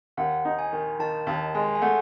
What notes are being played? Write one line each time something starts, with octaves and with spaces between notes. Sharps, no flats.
D#2 F#5
D#4
G#5
D#3
D#3 A5
D#2 A5
G#3 G#5
G#5
A3 F#5